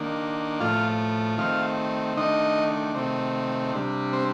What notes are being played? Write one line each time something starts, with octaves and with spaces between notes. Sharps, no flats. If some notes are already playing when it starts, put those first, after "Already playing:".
Already playing: D#3 A#3 D4
A2 F3 A3 F4 F5
D#3 A3 C4 F4 F5
D#3 A3 D4 D#4 D#5
C3 D#3 A3 C4
C3 G3 D4
C4 C5